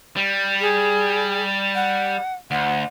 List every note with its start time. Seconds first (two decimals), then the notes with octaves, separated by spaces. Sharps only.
0.16 G3
0.61 G#4
1.75 F#5
2.51 D2 F#5